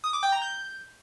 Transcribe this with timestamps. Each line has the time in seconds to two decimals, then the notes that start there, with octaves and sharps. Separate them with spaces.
0.04 D#6
0.13 D6
0.23 G5
0.32 A#5
0.42 G6